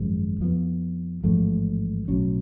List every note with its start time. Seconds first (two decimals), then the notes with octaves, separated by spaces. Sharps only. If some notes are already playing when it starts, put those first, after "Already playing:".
Already playing: G#1 F#2 F3 G#3
0.41 F2 F3 B3
1.23 A1 G#2 F3 A3
2.08 B1 A2 F#3 C#4